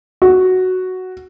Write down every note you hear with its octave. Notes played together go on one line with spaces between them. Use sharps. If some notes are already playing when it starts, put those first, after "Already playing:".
F#4